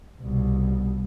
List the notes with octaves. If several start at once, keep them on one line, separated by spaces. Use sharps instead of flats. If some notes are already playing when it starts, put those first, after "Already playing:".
C2 B2